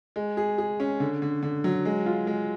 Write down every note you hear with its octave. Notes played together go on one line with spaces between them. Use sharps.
G#3
G#4
G#4
C#4
D3
D3
D3
F#3
G#3
F4
G#3